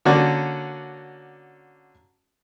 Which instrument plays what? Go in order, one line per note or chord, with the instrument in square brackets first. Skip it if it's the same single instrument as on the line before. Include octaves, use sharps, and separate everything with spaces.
[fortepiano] D3 A#3 C#4 F#4 D5